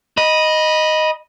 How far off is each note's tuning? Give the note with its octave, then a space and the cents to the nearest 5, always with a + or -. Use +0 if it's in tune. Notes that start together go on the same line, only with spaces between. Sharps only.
D#5 +0 B5 -20